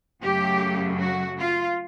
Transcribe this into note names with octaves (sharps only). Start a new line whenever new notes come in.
F#2 C#3 F#3 A3 G4
F#4
F4